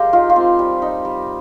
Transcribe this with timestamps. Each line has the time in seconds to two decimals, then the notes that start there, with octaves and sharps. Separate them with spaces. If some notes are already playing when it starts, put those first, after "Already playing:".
Already playing: G#3 G4 A#4 F5 C6
0.13 D#4 F4
0.30 F4
0.36 C4
0.59 G3
0.82 D#4
1.05 G3